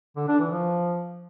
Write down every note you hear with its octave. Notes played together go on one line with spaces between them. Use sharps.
D3
D4
E3
F3